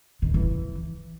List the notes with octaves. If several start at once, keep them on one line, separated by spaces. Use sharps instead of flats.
D#3
E3